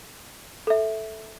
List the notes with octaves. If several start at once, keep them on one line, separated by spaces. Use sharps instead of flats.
A4 E5